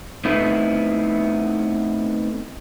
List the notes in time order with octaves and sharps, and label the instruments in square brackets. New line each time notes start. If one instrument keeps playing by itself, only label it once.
[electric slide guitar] A3 B3 C4 D#4 E4